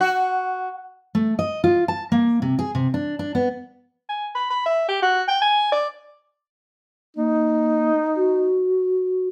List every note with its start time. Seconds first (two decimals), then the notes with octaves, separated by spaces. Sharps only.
0.01 F#4
1.15 A3
1.39 D#5
1.64 F4
1.88 A5
2.12 A#3
2.42 C3
2.59 G#4
2.75 C3
2.94 D4
3.19 D4
3.35 B3
4.09 G#5
4.35 B5
4.50 B5
4.66 E5
4.88 G4
5.02 F#4
5.28 G5
5.41 G#5
5.72 D5
7.16 A#3 D#4
8.16 F#4